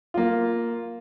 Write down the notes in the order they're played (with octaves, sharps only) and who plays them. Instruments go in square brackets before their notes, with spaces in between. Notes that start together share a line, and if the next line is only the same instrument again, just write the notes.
[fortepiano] A#3 F4